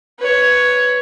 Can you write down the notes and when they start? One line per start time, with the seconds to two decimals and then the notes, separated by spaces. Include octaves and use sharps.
0.19 B4 C#5